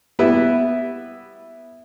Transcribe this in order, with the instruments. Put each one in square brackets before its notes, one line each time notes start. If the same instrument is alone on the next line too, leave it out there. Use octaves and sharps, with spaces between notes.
[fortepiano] G3 B3 E4 B4 E5